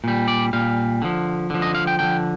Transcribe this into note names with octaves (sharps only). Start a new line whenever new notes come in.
A#2 G3
D5
A#2 G3 F5
D3 F3
D3 F3
D#5
F5
G5
D3 F3 G5